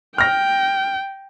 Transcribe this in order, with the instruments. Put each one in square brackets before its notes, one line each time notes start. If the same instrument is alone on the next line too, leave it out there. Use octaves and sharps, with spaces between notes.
[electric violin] G5 [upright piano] F6 A#6